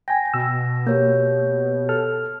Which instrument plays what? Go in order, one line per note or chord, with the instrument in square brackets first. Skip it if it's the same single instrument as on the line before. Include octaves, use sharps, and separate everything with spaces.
[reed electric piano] G5 G#5 [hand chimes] A#6
[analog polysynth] B2 [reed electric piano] E6
[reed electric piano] A#3 [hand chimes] G4 C#5 G6
[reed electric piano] A4 F6